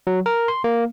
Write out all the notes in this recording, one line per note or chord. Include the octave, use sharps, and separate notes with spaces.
F#3
A#4
C6
A#3